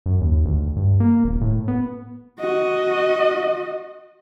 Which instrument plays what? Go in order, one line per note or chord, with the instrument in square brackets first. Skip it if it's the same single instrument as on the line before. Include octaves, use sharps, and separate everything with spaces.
[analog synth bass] F#2
D#2
D2
G2
A#3
D#1
A2
B3
[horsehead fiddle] F#4 D#5